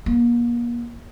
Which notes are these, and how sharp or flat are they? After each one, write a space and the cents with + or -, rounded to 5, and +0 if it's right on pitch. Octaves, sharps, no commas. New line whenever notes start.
A#3 +35